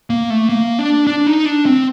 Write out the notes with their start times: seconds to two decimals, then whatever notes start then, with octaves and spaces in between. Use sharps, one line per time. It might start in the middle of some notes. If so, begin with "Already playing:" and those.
0.10 A#3
0.30 A3
0.49 A#3
0.79 D4
1.07 D4
1.27 D#4
1.46 D4
1.66 C4